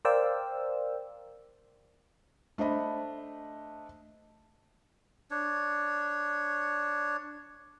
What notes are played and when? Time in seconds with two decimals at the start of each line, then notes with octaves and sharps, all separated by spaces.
0.05 A#4 C5 D5 F5 G5 E6
2.58 A3 D4 C5 D#5 B5
5.31 D4 C#5